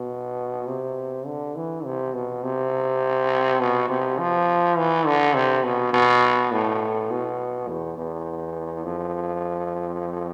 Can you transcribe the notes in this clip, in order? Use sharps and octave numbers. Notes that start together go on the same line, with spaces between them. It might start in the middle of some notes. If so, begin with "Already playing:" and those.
Already playing: B2
C3
D3
E3
C3
B2
C3
B2
C3
F3
E3
D3
C3
B2
B2
A2
B2
E2
E2
F2